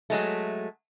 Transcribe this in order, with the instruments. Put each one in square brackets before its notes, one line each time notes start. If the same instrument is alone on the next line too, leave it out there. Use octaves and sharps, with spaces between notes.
[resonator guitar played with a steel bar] F#3 G#3 A3